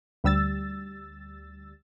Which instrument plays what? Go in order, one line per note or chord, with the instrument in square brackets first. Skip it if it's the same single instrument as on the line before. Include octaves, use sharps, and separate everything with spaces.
[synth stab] D2 G3 E6 A6